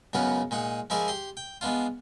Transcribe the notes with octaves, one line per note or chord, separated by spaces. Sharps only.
C#2 F#2 C#3 B3 A#4 F#5
A#2 G#3 D#4 F#5
F3 G#3 E4 G#4 A#4 D5
G4 C6
G5
G#3 B3 D4 F4